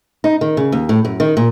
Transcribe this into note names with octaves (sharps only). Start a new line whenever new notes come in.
D#4
D#3
C#3
D#2
A2
F#2
D#3
A#2